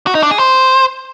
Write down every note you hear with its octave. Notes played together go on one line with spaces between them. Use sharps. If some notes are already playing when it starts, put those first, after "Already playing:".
F#4
D#4
D4
G#4
C5